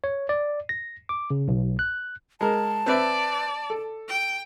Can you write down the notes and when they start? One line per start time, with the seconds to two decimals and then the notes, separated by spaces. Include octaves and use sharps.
0.04 C#5
0.29 D5
0.69 A#6
1.09 D6
1.30 C#3
1.48 B1
1.79 F#6
2.41 G#3 A#4 A5
2.86 C4 B4 D5 E5
3.70 A4
4.08 G5